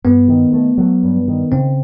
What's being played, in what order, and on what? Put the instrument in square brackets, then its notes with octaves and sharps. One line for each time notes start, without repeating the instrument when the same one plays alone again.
[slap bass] G2 [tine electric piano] B3
[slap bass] D#3
A3
F#3
G2
D#3
[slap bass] C#3 [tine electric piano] C4